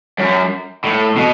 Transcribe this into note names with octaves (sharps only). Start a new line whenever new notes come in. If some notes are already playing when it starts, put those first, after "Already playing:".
F#2
A2
B2